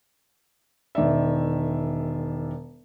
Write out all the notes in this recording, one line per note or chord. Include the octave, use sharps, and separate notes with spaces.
E1 D#3 D5 E5